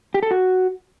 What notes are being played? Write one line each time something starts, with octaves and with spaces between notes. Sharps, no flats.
G4
A4
F#4